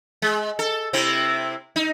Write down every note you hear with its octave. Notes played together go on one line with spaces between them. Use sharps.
G#3
A4
C3 C4 E4
D#4